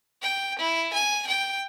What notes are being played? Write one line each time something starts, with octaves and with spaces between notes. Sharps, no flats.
G5
E4
G#5
G5